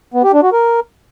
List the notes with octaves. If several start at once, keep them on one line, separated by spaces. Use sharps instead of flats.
B3
G4
D4
F#4
A#4